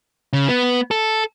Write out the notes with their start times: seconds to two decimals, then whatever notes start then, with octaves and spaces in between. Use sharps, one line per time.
0.33 C#3
0.49 B3
0.91 A4